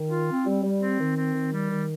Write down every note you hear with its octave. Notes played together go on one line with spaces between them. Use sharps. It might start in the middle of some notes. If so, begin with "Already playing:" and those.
Already playing: D#3
F4
C4
G3
G3
C4
D#3
C4
D#3
G3
D#3